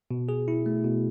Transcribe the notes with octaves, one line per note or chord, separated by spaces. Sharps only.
B2
G#4
E4
A3
B2